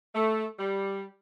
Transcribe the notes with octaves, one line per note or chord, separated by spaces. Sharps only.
A3
G3